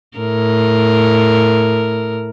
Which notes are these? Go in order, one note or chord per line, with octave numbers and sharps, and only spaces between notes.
A2 A#4